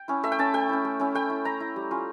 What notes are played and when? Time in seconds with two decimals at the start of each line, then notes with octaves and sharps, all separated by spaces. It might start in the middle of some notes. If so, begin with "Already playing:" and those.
Already playing: G5
0.08 C#4 E4
0.23 A3 E5
0.32 G5
0.39 C#4 E4 A5
0.54 A3 G5
0.69 C#4 E4
0.85 A3
1.00 C#4 E4
1.15 A3 G5
1.30 E4
1.45 A3 A#5
1.60 E4
1.76 G3
1.91 C#4 F4